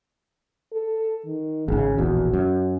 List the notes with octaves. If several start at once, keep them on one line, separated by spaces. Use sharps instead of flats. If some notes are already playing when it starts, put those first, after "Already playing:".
A4
D#3
G#1 C#3 G#4
E1 A#1 E2 F#4
F#2